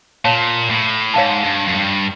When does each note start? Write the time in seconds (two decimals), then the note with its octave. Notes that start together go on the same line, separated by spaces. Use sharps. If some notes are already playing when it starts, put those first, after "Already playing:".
0.24 A#2 C#5 F5 A5
0.70 A2
1.14 G#2 C#5 F5 A5
1.44 G2
1.68 F#2
1.74 G2